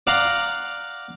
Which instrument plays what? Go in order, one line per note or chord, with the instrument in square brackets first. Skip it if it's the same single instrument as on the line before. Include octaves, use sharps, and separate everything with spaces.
[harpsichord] D5 F5 F#5 A#5 C6 D6